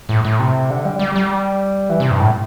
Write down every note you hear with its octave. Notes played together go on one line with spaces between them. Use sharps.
A2
A2
C3
D3
G3
G3
G3
E3
C3
G2
A2